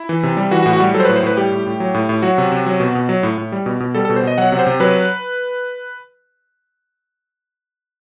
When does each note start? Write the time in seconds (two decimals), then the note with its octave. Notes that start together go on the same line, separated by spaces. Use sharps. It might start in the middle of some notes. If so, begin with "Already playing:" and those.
Already playing: E4
0.09 E3
0.23 C3
0.37 G3
0.51 E3 F#4
0.63 F#4
0.66 A2
0.73 F#4
0.80 G3
0.94 F#3 A4
1.00 C5
1.05 A2 B4
1.16 C5
1.23 A2 B4
1.37 G3 G4
1.51 A2
1.66 A2
1.80 F#3
1.94 A2
2.09 A2
2.22 F#3 F#4
2.38 C3
2.52 C3
2.66 F#3
2.80 B2
2.95 B2
3.09 F#3
3.23 A2
3.38 A2
3.52 G3
3.66 B2
3.80 B2
3.95 G3 A4
4.05 B2 A4
4.16 C5
4.23 B2 D#5
4.38 F#3 F#5
4.52 C3
4.59 C5
4.67 C3
4.80 F#3 B4